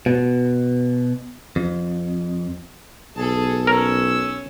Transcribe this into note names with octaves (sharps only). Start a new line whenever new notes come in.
B2
F2
B1 G#4 A4 A5
C#4 A#4 E6